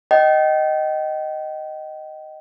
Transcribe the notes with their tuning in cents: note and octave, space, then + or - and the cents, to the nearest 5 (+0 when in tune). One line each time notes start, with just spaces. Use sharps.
D#5 +0 G5 -30